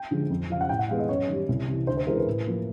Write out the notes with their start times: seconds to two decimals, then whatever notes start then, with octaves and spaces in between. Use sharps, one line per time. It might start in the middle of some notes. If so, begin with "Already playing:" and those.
Already playing: G5
0.11 D3 F3 G#3
0.30 F2
0.50 C#3 F3 F5
0.61 F#5
0.69 A2 G5
0.79 F#5
0.89 E3 G#3 B3 F5
0.99 D#5
1.09 F#2 C#5
1.28 D#3 G3
1.49 C2
1.68 C3 E3
1.87 D2 C5
1.97 C5
2.07 C#3 E3 G#3 A#4
2.17 B4
2.26 A2
2.47 F3 A#3